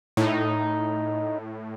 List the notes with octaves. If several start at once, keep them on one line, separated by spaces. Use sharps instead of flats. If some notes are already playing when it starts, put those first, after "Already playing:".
A2 D#4